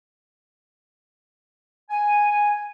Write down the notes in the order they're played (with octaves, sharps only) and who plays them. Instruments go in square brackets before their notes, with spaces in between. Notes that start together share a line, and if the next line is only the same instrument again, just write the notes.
[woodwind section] G#5